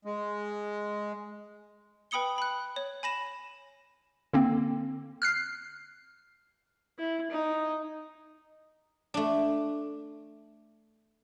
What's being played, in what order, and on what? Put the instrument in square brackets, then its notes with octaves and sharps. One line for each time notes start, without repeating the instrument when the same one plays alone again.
[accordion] G#3
[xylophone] B4 G5 B5 D#6 C#7 G7
B5 F#6
C#5
G#5 B5 A#6 E7
[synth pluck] D3 A#3 C4
F6 F#6 C7
[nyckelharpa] E4
D#4
[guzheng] A3 D4